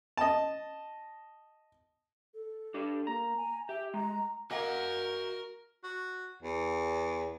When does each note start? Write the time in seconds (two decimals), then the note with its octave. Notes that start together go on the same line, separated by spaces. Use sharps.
0.17 D#5 A5
2.34 A4
2.74 D4 G4
3.07 A#3 A#5
3.37 G#5
3.69 G4 E5
3.94 G#3 A#5
4.51 A#3 F#4 A#4 D#5 F#5 G#5
5.84 F#4
6.42 E2